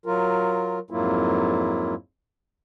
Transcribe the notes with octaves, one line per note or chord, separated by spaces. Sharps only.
F#3 F4 A#4
F2 G#2 F#3 A#3 E4 F4